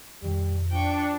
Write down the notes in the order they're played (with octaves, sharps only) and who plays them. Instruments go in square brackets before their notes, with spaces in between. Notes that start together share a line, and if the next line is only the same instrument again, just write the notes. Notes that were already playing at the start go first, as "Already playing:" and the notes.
[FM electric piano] F2 A#2 D#3 [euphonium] G3
[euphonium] F3 [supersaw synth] D4 [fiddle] G5 C#6